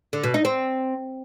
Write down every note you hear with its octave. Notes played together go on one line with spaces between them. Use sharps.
D3
B2
D#4
C4